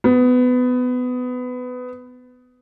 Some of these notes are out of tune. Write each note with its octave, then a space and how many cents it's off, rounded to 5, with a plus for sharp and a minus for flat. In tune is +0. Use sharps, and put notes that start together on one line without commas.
B3 +20